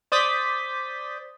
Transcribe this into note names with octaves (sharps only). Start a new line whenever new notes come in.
C5 D5 D#6 G6 A6 B6